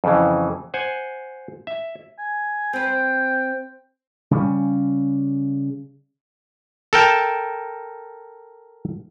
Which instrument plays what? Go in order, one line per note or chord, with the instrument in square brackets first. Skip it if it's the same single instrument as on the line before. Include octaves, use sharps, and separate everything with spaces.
[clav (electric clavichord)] F2 C#3 E3
C5 F#5 G#5
E5
[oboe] G#5
[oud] C4 B4 [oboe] G5
[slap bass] C#3 G3 C#4
[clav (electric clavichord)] A4 A#4 G5 A5